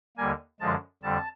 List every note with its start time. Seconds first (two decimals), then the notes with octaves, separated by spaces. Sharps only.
0.17 D#2 D3 G3 A#3 G#5
0.60 F#2 D3 F3 G#3 A5
1.03 F2 D3 G3 A5